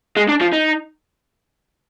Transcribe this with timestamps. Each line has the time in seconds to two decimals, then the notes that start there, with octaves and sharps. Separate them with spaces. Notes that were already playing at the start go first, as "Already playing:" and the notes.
0.17 G#3
0.28 D4
0.41 F3
0.53 D#4